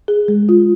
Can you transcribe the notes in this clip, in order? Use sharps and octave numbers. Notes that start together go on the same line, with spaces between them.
G#4
G#3
F4